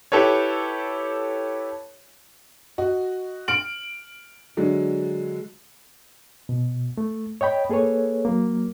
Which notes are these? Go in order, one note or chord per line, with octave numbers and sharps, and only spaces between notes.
E4 G4 A4 B4 C#5
F#4 D#5
F6 D7 F#7
D3 F#3 G#3
B2
A3
C#5 D#5 G5 B5
A#3 G#4 A4 B4 C#5
F#3 A#3